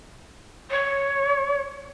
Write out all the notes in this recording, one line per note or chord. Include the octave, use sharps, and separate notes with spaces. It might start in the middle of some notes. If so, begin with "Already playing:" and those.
C#5